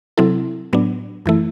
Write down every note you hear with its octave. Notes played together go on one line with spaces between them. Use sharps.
C3 F#3 C4 E4 A4
A2 F#3 B3 D4
F#2 E3 A3 E4